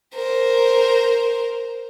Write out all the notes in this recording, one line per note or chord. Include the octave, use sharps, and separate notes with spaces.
A#4 C5